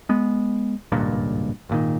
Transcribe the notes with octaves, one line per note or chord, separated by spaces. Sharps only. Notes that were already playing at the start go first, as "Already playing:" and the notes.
G#3 B3
G#1 C#2 G2 A#2
G#1 A#2 D#3